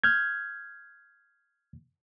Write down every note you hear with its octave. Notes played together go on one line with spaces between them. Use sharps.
F6 G6 G#6